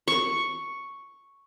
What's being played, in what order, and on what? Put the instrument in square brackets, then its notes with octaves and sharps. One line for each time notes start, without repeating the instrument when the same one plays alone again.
[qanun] C#6